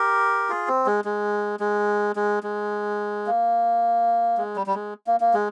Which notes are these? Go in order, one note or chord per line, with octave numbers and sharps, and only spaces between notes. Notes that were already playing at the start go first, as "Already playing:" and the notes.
Already playing: G4 A#4
F4 G#4
C4
G#3
G#3
G#3
G#3
G#3
A#3
G#3
G3
G3
G#3
A#3
A#3
G#3